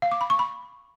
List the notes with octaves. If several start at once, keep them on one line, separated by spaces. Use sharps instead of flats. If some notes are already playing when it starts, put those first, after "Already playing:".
F5
D6
B5
C#6
B5